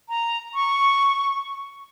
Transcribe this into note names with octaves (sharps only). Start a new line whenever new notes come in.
A#5
C#6